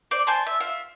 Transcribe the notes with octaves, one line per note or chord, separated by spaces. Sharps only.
C5 D5
C5 G#5 A5 C6
E5
F4 E5